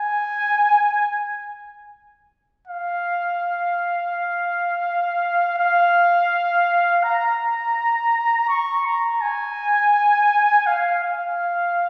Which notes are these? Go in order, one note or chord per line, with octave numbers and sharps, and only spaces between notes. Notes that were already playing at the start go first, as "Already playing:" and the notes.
Already playing: G#5
F5
F5
A#5
C#6
A#5
G#5
F5
F5